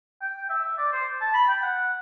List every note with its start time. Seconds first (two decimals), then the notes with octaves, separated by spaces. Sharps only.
0.21 G5
0.50 E5
0.64 E5
0.78 D5
0.92 C5
1.21 A5
1.34 B5
1.48 G5
1.63 F#5